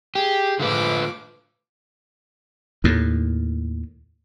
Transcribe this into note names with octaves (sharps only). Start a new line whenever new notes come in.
G4 G#4
A2 D3 F3 F4 B4 D6
D#2 A2